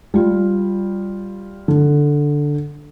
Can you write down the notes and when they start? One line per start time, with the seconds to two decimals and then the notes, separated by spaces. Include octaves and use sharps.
0.14 G3 F4
1.68 D3